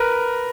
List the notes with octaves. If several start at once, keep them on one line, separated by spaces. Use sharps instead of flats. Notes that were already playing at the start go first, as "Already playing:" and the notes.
Already playing: A#4 B4